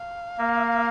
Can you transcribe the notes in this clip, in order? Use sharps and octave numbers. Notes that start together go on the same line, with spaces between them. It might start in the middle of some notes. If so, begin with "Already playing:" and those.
Already playing: F5
A#3